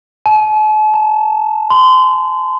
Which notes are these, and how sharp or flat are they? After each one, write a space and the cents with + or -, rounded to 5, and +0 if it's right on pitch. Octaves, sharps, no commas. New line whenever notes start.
A5 -45
A5 +40
C6 -30